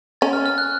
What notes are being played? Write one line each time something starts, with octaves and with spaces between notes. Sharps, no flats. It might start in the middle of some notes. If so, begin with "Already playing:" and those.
C#4 A6
F6
F6
F#6